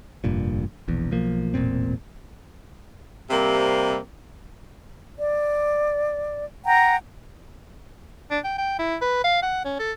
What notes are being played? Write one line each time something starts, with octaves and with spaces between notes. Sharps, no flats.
F1 G2 A#2
E1 A#1 E2
B1 F3 A#3
E1 A1 A#2 C4
C3 G3 A#3 C4
D5
F#5 G5 A#5
D4
G5
G5
E4
B4
F5
F#5
C#4
A4